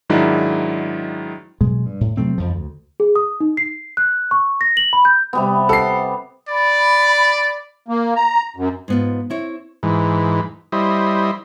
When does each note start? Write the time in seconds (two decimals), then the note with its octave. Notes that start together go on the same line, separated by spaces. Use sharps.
0.09 G#2 D#3 F#3 G#3 D4 E4
1.61 B2 F#3 G#3
1.86 G2
2.01 A2
2.17 C3 F#3 A3 C4
2.38 F2 F3
2.55 D2
3.00 G#4
3.16 D#6
3.40 D#4
3.57 C7
3.97 F#6
4.31 C#6
4.61 A#6
4.77 F#7
4.93 B5
5.05 G6
5.33 C3 G3 B3
5.69 G4 A4 C7
6.49 D5 B5
7.88 A#3
8.16 A#5
8.56 F#2
8.88 G#2 B3 F4
9.30 C4 E4 C#5
9.83 G#2 E3
10.72 G3 E4 C5 D#5